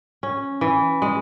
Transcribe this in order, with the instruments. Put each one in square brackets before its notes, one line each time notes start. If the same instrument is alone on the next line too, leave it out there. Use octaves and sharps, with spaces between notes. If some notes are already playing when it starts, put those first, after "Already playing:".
[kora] C#4
E3
G#3